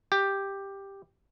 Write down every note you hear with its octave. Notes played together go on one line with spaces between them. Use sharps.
G4